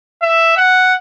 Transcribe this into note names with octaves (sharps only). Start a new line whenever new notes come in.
E5
F#5